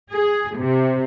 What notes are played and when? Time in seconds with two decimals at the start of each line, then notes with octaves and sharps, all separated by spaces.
0.12 G#4
0.57 C3